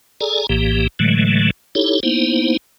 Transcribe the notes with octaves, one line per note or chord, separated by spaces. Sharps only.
G#4 A4 D5 G#5 A#5
A#1 A2 E3 A#3 G4
A2 D3 E3 F#3 G#3 A3
D#4 E4 G4 A4 C#5
A#3 B3 D#4 E4 C5